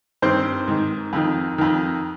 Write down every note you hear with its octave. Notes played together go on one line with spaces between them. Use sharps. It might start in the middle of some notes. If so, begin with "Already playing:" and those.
G2 D#3 C4 C5
G#2 D#3
F2 D#3
F2 D#3